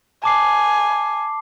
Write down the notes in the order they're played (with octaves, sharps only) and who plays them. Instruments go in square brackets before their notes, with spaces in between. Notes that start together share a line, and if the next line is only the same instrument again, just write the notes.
[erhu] G#5 [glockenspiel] A5 D6 C7